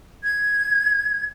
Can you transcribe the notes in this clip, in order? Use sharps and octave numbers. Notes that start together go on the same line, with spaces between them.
G#6